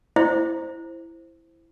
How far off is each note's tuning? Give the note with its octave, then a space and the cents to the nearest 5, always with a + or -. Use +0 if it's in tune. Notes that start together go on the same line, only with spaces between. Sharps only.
E4 +5 C5 +0